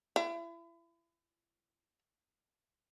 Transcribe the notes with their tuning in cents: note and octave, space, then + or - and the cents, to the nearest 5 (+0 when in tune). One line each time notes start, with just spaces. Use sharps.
E4 +35